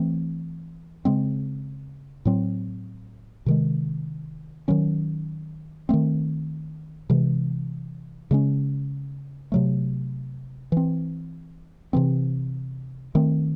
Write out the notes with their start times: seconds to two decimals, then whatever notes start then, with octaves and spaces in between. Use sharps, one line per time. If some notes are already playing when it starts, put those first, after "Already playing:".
Already playing: E3 A3 C4
1.05 C#3 G#3 C4
2.25 A2 F#3 C4
3.46 C3 D#3 G#3
4.68 D#3 F#3 C#4
5.89 D#3 A3 C4
7.10 C3 E3 G#3
8.31 C#3 G#3 C#4
9.52 C3 F#3 A3
10.72 E3 C4
11.93 C3 E3 C4
13.15 D#3 A3 C4